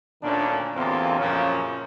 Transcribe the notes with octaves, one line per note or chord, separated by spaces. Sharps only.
D2 A#2 D#3 C#4 D4
A1 E2 D3 A#3 C4 F4
F#2 A#2 C#3 F3 C#4